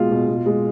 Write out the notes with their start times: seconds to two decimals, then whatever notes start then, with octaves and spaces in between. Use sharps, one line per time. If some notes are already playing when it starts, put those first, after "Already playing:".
Already playing: B2 G#3 F4 F5
0.11 B2
0.28 B2
0.46 G#3